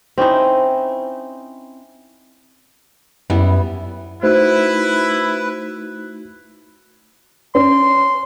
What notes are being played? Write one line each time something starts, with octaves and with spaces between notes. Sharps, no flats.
C4 C#4 D#4 E4
F#2 G3 B3 E4
A3 D#4 E4 F#4 B4 C5
C#4 C6